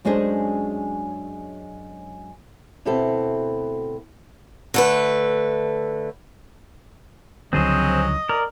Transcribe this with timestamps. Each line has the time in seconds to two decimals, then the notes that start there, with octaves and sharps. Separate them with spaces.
0.05 F#2 G#3 C#4 D4 G#4 C5
2.85 D2 B2 B3 C4 E4 A4
4.74 D3 A3 B4
7.53 C#2 D3 F3 F#3 C4 G#4 C5 D#5
8.29 A#4 D5